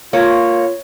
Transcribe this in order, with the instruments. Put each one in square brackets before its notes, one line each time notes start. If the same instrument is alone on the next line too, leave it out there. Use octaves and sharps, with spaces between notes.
[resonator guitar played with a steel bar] A#3 [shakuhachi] F4 [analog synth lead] C#5